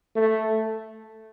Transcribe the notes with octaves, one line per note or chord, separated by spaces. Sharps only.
A3